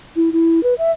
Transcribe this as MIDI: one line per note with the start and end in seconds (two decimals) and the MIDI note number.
0.16 0.30 64
0.33 0.63 64
0.63 0.74 71
0.78 0.91 76